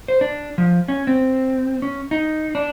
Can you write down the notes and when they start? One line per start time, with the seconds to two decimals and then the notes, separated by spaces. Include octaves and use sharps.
0.08 C5
0.21 D4
0.58 F3
0.88 C#4
1.07 C4
1.82 C#4
2.11 D#4
2.55 D4